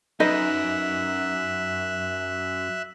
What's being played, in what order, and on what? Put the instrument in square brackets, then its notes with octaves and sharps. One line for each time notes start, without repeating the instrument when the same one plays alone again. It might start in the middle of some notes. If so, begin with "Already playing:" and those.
[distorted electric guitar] F#2 [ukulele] D#4 B4 D#5 [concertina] E5 F#6